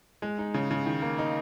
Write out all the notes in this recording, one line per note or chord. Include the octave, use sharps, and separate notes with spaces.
G#3
D#4
C#3
C#3
D#3
A#3
D#4